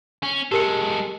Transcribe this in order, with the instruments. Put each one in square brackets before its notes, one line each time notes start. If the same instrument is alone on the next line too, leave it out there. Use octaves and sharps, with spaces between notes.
[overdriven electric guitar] C#4
[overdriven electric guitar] G#3 A4 [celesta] G4 A#4 C#7